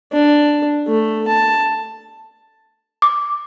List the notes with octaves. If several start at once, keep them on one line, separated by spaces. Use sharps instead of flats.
D4
A3
A5
D6